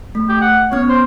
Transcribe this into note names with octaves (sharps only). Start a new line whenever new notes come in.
A3
G4
F#5
B3 C#4 C#5 F6
C5